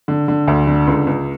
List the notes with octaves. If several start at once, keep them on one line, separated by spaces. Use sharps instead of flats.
D3
D3
D2
D3
C#2
C#2